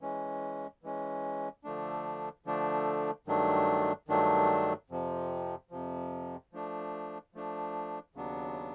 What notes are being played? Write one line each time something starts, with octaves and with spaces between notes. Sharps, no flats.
E3 G#3 C#4
E3 G#3 C#4
D3 F3 A3 D4
D3 F3 A3 D4
G2 D#3 F#3 A3 D4
G2 D#3 F#3 A3 D4
F2 C3 F3
F2 C3 F3
F3 A3 D4
F3 A3 D4
D#2 C#3 F#3 B3 D4